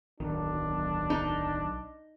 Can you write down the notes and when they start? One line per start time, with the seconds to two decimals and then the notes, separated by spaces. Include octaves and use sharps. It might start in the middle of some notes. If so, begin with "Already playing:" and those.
0.20 D1 B1 D#3 D4
1.10 D#4